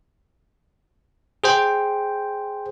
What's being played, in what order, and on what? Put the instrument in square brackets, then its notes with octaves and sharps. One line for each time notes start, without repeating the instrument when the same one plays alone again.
[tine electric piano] G#4 C5 G5